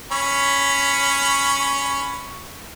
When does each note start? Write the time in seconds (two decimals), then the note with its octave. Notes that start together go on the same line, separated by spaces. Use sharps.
0.12 C#4 C#5 B5